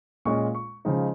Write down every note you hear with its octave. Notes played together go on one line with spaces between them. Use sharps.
A#2 G#3 C#4 F4 C#6
C#6
C#3 F3 G#3 D#4